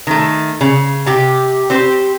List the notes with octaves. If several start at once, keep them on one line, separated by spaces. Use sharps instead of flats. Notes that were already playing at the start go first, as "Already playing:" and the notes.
D#3 A3
C#3
C3 G4
C4 G4 C5